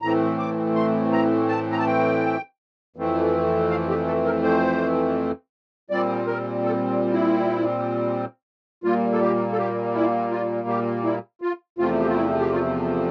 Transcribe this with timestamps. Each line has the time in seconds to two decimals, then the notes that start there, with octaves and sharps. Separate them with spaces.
0.02 A2 E3 A3 C4 A#5
0.39 D6
0.75 C6
1.12 A#5
1.49 A5
1.71 A#5
1.78 A5
1.86 G5
2.96 F2 E3 A3 C4
3.70 F5
3.89 G4
4.06 A4
4.25 A#4
4.43 C5
5.90 A#2 G3 C4 D5
6.27 A#4
6.64 A4
7.13 E4
8.84 A#2 G3 A#3 F4
9.12 A4
9.21 G4
9.52 A4
9.58 G4
9.94 E4
10.31 F4
10.68 G4
11.04 E4
11.42 F4
11.78 E2 C3 F3 A3 C4 F4
11.99 G4
12.08 F4
12.15 E4
12.40 G4
12.52 F4